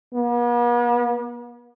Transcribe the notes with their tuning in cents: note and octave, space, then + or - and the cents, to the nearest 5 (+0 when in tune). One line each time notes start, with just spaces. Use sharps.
B3 -45